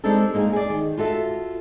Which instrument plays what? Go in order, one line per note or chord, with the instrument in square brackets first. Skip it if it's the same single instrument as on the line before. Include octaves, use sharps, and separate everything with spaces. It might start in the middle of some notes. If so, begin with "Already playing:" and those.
[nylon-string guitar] G3 G#3 C4 D4 D#4 A4
G#3 A#3 D#4 G4 G#4
G#4 D5
D#3
F4 F#4 A4 E5